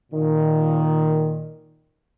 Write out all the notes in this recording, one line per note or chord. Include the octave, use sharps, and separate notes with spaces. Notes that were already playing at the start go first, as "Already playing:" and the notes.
A#2 D#3